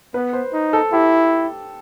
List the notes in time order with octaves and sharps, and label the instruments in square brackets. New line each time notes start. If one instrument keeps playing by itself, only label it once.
[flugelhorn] B3 [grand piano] B4
[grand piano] C5
[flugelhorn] D#4
[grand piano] A4
[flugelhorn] E4 [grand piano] G4